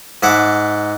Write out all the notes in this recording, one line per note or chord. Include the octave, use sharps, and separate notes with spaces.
G#2 E5 F#5 D6